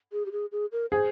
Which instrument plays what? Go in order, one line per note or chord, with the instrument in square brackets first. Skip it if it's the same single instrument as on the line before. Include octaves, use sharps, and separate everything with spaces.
[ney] G#4
G4
G#4
G#4
A#4
[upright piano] G#4 [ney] C5